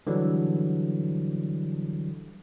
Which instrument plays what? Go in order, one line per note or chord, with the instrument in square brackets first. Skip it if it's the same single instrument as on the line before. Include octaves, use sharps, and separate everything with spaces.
[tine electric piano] D3 E3 F#3 G3